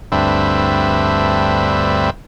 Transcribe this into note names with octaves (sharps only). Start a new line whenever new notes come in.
D2 G2 C4 B4 E5